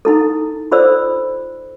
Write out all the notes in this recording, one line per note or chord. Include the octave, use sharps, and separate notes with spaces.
D#4 E4 A4
F4 A4 C5 D5 E6